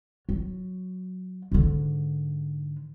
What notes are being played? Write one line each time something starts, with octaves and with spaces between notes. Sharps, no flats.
F#3
G#2 D3